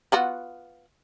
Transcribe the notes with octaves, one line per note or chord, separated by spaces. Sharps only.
B3 F4 F#4